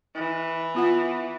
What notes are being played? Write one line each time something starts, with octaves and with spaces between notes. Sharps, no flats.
E3
B3 F4 F#5